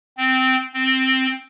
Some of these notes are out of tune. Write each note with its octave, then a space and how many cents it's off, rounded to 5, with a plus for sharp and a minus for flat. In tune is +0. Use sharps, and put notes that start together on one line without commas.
C4 -10
C4 +5